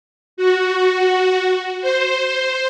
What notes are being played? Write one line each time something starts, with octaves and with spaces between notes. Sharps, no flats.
F#4
C5